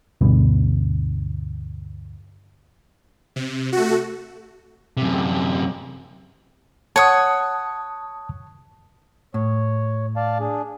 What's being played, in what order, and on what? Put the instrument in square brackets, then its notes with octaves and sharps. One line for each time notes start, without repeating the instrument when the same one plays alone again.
[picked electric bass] D2 G2 B2
[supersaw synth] C3
A3 F#4
[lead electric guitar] F#2 C3
[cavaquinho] C#5 F#5 [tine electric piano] A5 D#6
[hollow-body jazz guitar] A2 [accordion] C#5
[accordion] D5 F5 A5
D4 G#4